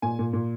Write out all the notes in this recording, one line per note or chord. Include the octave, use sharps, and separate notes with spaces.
A#2 G#5
A#2
A#2